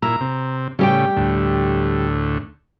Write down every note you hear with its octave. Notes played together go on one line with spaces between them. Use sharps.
A#2 E4 A#5
C3
A2 C#3 G3 G4 G5
D2 A2